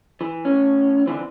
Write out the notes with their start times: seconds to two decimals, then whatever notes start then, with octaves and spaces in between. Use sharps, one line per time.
0.21 E3
0.45 A2 C#4
1.06 D3 E3 C4